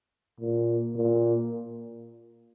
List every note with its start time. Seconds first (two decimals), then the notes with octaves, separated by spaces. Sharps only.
0.40 A#2
0.95 A#2